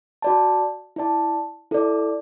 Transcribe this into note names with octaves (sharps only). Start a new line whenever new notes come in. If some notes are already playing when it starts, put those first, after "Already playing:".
F#4 D5 A5
E4 D5 A5
E4 A4 D5